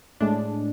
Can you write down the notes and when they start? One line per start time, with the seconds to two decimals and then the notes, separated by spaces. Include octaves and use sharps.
0.20 A2 G#3 D4